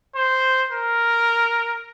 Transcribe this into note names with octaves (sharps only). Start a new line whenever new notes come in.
C5
A#4